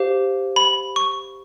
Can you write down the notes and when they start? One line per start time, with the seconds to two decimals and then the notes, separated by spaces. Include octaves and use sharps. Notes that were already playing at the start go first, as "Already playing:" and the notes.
Already playing: G4 C5 F5
0.56 B5
0.96 C#6